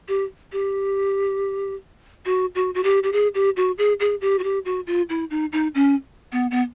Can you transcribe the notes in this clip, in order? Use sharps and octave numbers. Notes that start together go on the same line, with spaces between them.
G4
G4
F#4
F#4
F#4
G4
G4
G#4
G4
F#4
G#4
G#4
G4
F#4
G4
F#4
F4
E4
D#4
D#4
C#4
B3
B3